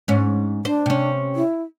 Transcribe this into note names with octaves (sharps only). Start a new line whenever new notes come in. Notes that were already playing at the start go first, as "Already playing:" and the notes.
G#2 C#4
D4 C5
C3 C#4
E4